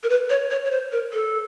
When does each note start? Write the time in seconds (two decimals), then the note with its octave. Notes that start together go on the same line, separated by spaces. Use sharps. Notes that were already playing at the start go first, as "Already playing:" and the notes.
0.03 A#4
0.09 B4
0.30 C#5
0.51 C#5
0.65 C#5
0.71 C5
0.92 A#4
1.13 A4